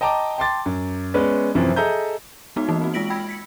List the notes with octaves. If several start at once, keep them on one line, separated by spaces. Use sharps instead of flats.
D#5 G5 A5 A#5 D6
G5 A5 C6 D6 A6
F#2
G#3 B3 C#4 B4 D5
F#2 C3 E3 F3 C4
G#4 A4 D#5 E5 A#5 G6
G#3 B3 D#4 F#4
E3 A#3 D#4
C4 F#4
G#3 F4 A#6 B6 D7 F#7
G5 B5 E6 G#6
B6 C#7